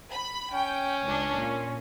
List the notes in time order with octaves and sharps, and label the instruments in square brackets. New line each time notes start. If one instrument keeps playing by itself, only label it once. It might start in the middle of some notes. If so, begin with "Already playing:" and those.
[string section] B5
[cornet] C#4 [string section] G5
[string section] C#2 D4
A#2